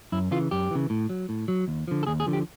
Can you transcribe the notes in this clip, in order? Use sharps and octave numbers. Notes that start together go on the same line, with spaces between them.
F#2 E4
C#3 E3 F4
F#2 G4
C#3 E3
A2
F#3
A2
F#3
D#2
D3 F3
A4
D#2 G#4
G#4
D3 F3
G4